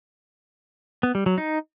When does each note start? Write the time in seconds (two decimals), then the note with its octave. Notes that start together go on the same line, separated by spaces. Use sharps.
1.03 B3
1.15 G3
1.26 F#3
1.38 D#4